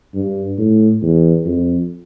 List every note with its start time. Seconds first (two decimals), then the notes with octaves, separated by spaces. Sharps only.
0.15 G2
0.58 A2
1.02 E2
1.45 F2